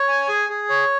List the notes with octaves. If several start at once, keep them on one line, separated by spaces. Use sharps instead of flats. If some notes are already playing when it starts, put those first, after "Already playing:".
Already playing: C#5
G#5
G#4
G#4
C#5